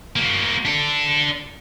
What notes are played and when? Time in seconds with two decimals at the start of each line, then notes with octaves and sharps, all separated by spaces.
0.16 A#3 F#4
0.65 D4 A4